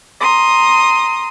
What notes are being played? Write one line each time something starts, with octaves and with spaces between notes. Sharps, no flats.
A#5 C6 D#6